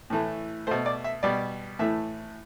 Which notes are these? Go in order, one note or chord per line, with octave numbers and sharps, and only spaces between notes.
A2 E3 A3
B2 A3 C5
D5
E5
B2 G3 D5
A2 E3 A3 E5